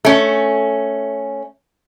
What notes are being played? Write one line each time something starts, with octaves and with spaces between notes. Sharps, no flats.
A3 C#4